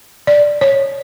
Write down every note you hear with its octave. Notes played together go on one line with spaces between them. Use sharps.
D5
C#5